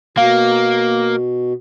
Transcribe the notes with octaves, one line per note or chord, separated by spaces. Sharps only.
B2 A#3 F5